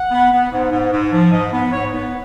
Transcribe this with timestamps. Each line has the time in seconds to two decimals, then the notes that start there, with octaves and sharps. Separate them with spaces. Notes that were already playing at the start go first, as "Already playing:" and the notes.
Already playing: F#5
0.11 B3
0.32 B3
0.51 G#2
0.72 G#2
0.92 G#2
1.13 F3
1.32 G#2 D#5
1.52 B3
1.72 G#2 C#5
1.93 B3